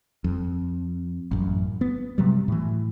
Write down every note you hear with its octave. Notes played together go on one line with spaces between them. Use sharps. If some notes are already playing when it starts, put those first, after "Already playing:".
F2
A1 F#2
B3
C3 F#3 G3
A2 E3